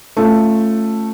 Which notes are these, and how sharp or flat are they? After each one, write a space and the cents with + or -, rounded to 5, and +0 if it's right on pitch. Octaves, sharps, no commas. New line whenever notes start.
A3 +0 C#4 -20 F4 -10